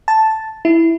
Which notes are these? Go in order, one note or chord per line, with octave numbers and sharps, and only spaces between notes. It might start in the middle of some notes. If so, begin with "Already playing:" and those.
A5
E4